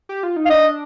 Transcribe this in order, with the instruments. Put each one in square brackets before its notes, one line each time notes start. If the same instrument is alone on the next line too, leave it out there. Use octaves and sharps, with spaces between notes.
[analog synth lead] G4
F4
D#4
[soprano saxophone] F5
[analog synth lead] D4 [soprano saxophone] D#5